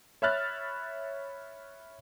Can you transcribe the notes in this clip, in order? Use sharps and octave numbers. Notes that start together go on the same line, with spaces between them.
C#5 E5 B5 F6 F#6 A6